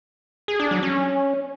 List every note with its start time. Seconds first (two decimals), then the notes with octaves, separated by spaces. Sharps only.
0.48 G#4
0.60 D4
0.71 F#3
0.83 C#4